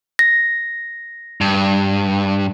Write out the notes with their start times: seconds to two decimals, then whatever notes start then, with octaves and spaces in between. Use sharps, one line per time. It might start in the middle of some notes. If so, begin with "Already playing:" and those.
0.19 A#6
1.41 G2